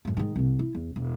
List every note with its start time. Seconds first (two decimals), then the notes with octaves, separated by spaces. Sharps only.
0.05 F#2 A2
0.17 G#2 D#3
0.36 C2 C3
0.59 E4
0.75 E2
0.96 E1